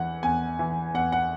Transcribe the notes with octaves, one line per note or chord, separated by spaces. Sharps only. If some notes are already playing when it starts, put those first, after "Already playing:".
Already playing: E2 E3 F#5
E2 G#5
E3
E2 F#5
F#5